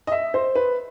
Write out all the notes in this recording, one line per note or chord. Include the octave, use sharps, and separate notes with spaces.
D#5
E5
C5
B4